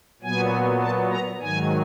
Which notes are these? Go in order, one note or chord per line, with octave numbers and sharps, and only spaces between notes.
A#2 F#3 B3 G#5
A5
A#5
G#2 D#3 F#3 G#5